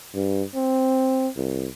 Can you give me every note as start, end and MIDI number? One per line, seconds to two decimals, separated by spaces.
0.15 0.43 43
0.55 1.28 60
1.36 1.67 36